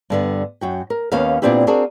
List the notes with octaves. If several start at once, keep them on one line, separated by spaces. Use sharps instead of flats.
G2 D3 B3
F#2 F#4 G5
A#4
D#2 B3 C#4 A#4 F5
A#2 B3 C4 D4 E4 G4
C4 D4 F#4 G#4 A#4